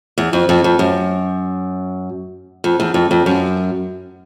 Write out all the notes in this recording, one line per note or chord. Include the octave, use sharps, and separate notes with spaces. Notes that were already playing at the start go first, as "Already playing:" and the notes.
E2
F2
F2
F2
F#2
F2
E2
F2
F2
F#2